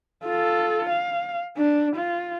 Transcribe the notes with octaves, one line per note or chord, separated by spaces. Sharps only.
F4 A4
F5
D4
F4